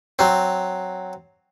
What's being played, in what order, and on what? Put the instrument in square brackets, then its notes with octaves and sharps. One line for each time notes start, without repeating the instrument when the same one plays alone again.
[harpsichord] F#3 C4